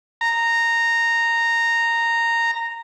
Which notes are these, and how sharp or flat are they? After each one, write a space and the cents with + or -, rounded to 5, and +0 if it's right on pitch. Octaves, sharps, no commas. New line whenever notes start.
A#5 -10